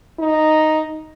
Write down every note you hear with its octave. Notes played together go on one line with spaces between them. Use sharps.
D#4